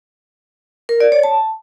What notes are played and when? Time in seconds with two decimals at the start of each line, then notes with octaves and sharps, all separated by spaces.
0.89 A#4
1.01 D5
1.12 C#5
1.23 A5